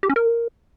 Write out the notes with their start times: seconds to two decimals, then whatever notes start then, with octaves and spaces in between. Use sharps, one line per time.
0.03 G4
0.09 C#4
0.16 A#4